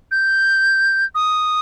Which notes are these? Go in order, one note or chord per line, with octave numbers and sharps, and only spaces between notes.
G6
D#6